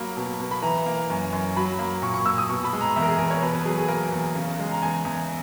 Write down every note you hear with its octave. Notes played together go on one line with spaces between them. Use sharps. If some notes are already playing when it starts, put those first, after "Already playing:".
Already playing: F#3 A#3 B5
B2
B2
B5
E3 A#5
A#3
F#2
F#2
F#3 B5
A#3
A#2 C#6
C#6
A#2 E6
D#6
B2 C#6
B5
G#3
A#5
E2 E5
A#4
G#4
E2 A#4
C#5
B2 B4
B4
F#3 G#4
G#4
A#3 A#4
E2
C#3
G#3
A#5
E2 G#5
E2